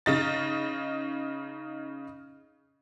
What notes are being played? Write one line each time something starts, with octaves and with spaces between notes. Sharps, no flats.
C#3 D#4 A6